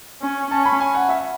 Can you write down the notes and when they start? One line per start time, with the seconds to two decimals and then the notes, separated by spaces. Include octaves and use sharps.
0.22 C#4
0.50 C#4 A5
0.65 B5
0.80 G#5
0.94 F#5
1.09 E5